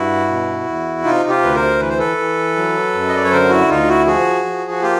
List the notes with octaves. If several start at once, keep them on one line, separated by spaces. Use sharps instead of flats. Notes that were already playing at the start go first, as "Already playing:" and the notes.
Already playing: G2 E4 F#4
B2
E2
C3 D#4 F4
F4 G4
D2 B4
A#4 C5
E3 B4
C5
A4 B4
E3
F#3
F#2
D#5
D5
C#5
D3 A#4 C5
E4 F#4
D2 D#4 F4
E4 F#4
F3 F#4 G#4
F3
F#4
A#3 F4 G4